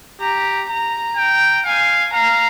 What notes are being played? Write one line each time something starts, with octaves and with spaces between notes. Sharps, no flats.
G4 A#5
A#5
G5
F5 G#5
F5 A#5